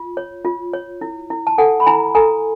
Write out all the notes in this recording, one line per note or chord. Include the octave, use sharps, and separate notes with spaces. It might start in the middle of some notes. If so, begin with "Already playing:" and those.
Already playing: F4
C#5
F4
C#5
E4
E4
A5
A4 F#5 G#5
B5
E4 G#5 A#5
A4 G#5 A#5